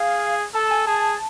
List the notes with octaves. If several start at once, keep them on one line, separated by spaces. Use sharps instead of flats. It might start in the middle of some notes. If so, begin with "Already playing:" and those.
Already playing: G#4 F5
A4 A5
A5
G#5
G#4 A5